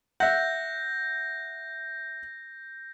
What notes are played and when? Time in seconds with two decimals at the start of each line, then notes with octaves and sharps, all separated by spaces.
0.20 E5 F#5 G6 A#6